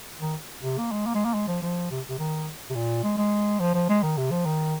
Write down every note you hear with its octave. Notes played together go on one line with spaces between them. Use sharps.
D#3
C3
A#3
G#3
A#3
G#3
A#3
G#3
F3
F3
C3
C3
D#3
C3
A#2
G#3
G#3
F3
F3
G#3
D#3
C3
F3
D#3